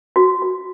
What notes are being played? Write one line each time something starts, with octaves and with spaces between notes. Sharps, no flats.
F#4
F#4